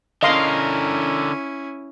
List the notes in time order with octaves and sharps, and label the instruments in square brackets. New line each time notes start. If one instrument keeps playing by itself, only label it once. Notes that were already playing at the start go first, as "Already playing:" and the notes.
[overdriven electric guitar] D3 A#4 [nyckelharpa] C#4 E4 [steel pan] D#5 F5 C6